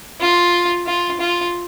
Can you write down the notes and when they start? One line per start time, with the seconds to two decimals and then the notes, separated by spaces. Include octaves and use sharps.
0.21 F4
0.87 F4
1.20 F4